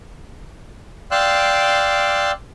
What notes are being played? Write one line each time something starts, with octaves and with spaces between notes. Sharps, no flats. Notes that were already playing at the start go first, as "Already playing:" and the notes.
D5 F5 G5 C6 E6 F#6